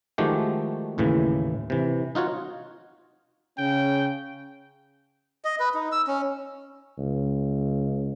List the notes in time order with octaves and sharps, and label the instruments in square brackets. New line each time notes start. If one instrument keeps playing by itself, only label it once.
[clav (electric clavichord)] D#3 F3 G#3 A3 F#4 G4
D#2 A2 C#3 E3
C3 E3
D#4 F4 F#4 C#5
[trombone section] C#3 C#4 [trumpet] G5
[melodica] D#5
B4
D#4
E6
C#4
[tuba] C#2